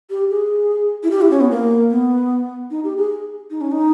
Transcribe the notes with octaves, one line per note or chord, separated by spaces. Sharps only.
G4
G#4
E4
G4
E4
C#4
B3
A#3
B3
D#4
G4
G#4
D#4
C#4
D#4